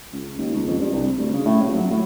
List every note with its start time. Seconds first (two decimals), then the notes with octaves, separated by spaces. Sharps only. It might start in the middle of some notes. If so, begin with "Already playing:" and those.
0.13 C#2
0.38 D#2
0.54 C#2
0.67 F2
0.79 G2
0.92 C2
1.17 D2
1.33 C#3
1.45 A2
1.62 D#1
1.74 F#3
1.90 A2